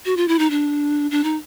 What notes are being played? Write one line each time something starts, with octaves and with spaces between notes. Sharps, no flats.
F#4
F4
E4
D#4
D4
D4
D#4